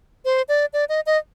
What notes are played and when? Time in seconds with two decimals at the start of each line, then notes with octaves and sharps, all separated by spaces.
0.25 C5
0.49 D5
0.73 D5
0.89 D#5
1.06 D#5